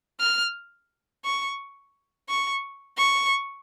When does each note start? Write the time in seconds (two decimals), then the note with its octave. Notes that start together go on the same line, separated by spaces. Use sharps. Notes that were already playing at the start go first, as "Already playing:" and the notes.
0.20 F6
1.24 C#6
2.29 C#6
2.98 C#6